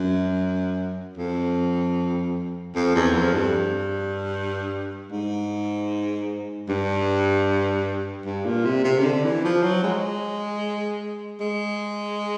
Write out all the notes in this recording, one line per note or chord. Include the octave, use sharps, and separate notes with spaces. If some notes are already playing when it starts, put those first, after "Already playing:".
Already playing: F#2
F2
F2
E2
F2
G2
G#2
G2
G2
A#2
C3
C3
C#3
D3
E3
F3
F#3
G#3
G#3